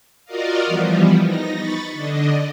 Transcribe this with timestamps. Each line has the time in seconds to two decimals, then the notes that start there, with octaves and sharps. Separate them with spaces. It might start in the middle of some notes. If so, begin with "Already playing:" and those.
0.25 F4 F#4 A#4 D5 D#5 F5
0.66 E3 F3 G3 B3
1.22 D#4 A#6
1.56 B5 C#6 A6
1.92 D3 D4 D#5